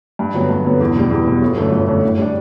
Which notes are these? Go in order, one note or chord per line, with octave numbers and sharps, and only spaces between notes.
G2
D3 F#3 B3
G2
D3 F#3 B3
E2
B2 G3
E2
B2 G3
G1
F#2 D3 A3
G1
F#2 D3 A3
A2
G3 D4